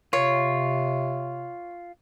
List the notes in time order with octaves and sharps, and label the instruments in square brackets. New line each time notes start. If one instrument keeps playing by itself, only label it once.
[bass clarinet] C3 [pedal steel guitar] F4 [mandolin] C#5